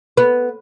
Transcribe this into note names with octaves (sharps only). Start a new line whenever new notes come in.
B3